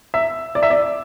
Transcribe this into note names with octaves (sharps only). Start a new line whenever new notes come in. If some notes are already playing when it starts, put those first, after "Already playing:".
E5
D5
E5
D5